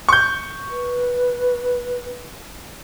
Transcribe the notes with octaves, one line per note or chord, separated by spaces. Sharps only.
C#6 G6
B4